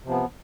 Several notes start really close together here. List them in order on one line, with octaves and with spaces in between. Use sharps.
C3 F3 B3